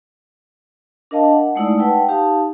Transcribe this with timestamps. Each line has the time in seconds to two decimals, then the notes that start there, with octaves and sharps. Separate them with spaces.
1.11 D4 A#4 D#5 F5 A5
1.32 F#5
1.55 G#3 A3 D#4 E4 D5 E6
1.79 B4 F#5 G5 A5
2.08 D#4 G4 F5 A5